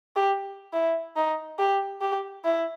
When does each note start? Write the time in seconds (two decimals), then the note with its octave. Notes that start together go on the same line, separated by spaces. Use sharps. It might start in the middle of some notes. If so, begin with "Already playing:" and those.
0.16 G4
0.73 E4
1.16 D#4
1.58 G4
2.01 G4
2.44 E4